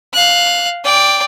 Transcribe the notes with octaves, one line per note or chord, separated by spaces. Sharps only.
F5 F#6
D5 G5